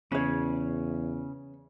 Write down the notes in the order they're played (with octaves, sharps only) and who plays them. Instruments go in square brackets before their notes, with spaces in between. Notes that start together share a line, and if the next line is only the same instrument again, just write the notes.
[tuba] E2 [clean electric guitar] C#3 [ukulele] C#4 C#5